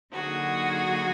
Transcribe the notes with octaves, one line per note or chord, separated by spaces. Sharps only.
D3 F#3 A#3 D#4 F#4 G#4